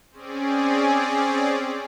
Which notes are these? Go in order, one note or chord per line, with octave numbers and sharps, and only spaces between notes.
C4 C#4 G#4 D5